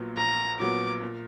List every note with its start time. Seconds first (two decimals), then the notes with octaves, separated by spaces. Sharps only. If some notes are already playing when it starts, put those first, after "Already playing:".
Already playing: A#1 A#2 F#3 B3
0.17 A#1 A#5
0.60 A#2 F#3 B3 D6
1.02 A#2